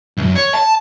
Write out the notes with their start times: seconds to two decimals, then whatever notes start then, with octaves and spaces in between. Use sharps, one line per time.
0.18 C2 F#2
0.36 C#5
0.55 A5